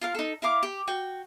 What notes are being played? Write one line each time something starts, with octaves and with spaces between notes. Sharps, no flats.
F4 A#4 F5
D#4 A4
E4 A#4 F5 D6
G4
F#4 G5